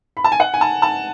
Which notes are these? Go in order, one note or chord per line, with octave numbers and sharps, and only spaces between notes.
B5
A5
G#5
F#5
G#5
A5
A5